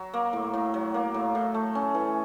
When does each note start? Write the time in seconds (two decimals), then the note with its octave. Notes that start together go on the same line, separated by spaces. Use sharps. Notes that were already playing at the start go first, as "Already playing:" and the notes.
Already playing: F#3
0.14 A#3
0.33 A2
0.54 A2
0.74 F#3
0.94 A#3
1.14 A2
1.35 A2
1.54 A3
1.75 C#4
1.95 E3